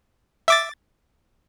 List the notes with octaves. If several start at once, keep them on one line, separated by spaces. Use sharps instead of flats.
E5 D6 A6